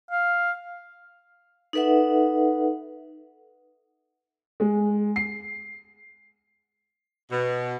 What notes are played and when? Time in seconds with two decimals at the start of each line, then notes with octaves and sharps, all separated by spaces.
0.11 F5
1.73 D#4 A4 B4 E5 F#5
4.60 G#3
5.16 C7
7.31 B2